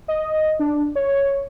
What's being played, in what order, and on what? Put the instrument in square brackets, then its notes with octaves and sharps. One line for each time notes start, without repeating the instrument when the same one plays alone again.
[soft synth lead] D#5
D4
C#5